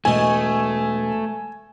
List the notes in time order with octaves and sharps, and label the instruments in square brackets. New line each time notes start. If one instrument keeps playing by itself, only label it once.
[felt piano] E1 D#5 [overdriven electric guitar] A3 [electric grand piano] G#5